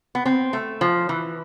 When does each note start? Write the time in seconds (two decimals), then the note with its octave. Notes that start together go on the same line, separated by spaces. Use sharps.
0.15 B3
0.25 C4
0.53 A3
0.81 F3
1.09 E3